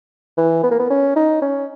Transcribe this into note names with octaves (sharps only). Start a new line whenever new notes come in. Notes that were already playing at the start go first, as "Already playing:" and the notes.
E3
B3
A#3
B3
C#4
D#4
C#4